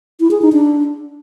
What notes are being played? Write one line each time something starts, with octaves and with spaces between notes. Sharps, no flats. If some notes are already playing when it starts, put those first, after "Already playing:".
E4
G#4
D#4
D4